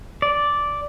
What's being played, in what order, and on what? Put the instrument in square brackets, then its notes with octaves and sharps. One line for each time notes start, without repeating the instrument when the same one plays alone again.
[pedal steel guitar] D5